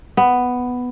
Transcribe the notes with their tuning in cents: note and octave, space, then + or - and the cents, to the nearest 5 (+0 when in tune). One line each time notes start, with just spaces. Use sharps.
B3 +5